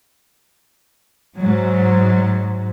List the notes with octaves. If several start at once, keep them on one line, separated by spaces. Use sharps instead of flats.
G#2 F#3